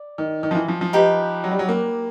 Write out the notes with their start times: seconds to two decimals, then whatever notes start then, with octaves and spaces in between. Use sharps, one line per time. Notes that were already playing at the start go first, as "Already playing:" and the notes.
Already playing: D5
0.18 D#3
0.43 D#3
0.51 F3
0.55 E3
0.68 F3
0.81 F3
0.93 D#4 G4 B4
1.44 F#3
1.51 G3
1.59 F#3
1.69 A#3